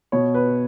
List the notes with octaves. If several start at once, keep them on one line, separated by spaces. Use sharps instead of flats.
B2 C#5
B4